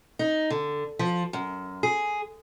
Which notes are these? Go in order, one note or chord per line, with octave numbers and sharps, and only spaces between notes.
D#4
D3
F3
F#2
G#4